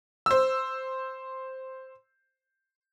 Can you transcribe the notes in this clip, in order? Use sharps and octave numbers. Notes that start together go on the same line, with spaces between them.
C5 E6